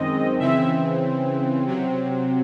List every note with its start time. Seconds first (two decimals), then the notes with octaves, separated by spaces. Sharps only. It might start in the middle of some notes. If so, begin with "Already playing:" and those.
Already playing: F#2 D#3 G#3 C4 D#5
0.39 C#3 E3 C4 E5
1.65 C3 F#3 C4